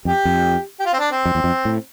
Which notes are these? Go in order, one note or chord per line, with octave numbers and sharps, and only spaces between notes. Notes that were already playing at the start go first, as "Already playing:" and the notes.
F2 G4
F2
G4
F4
C4
D4
C4
F2
E2
F2
A2